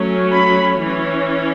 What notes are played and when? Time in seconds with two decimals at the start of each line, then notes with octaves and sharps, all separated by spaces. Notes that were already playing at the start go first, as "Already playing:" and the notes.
Already playing: F#3 A3 C#4
0.32 B5
0.80 E3
0.85 C#4